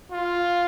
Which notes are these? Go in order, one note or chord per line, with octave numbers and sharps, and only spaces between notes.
F4